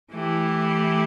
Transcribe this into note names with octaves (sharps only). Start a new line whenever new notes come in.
E3 A3 E4 G4